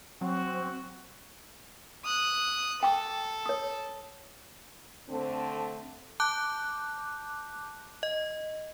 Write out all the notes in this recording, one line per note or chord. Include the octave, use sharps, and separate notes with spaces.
F#3 C4 F#4
D#6 F#6
A4 G5 D6
C#5 D#6
D3 A3 C4
A5 D6 F#6 G6
D#5